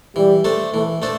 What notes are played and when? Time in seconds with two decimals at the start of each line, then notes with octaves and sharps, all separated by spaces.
0.16 E3 G3
0.45 A3 D4 A4 C5
0.74 E3 A3
1.02 A3 D4 A4 C5